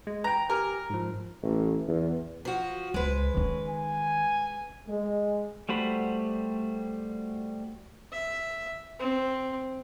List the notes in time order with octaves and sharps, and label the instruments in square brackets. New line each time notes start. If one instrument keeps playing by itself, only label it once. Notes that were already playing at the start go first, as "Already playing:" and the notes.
[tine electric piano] G#3
[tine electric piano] B4 G5 [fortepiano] A#5
[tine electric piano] G4 G#5 F6 [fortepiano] A#4
[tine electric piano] G#2 F3
[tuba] A1
E2
[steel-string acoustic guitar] F3 F#4
[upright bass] C#2 [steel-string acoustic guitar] G#3 B4 [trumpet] C5
[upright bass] D#3 D#4 [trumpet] C#4
[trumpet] G#5
[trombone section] G#3
[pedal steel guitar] G3 A3 F#4 C5 B5
[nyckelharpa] E5
C4